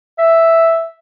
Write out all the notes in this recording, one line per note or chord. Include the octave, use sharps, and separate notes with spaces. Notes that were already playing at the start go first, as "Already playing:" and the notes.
E5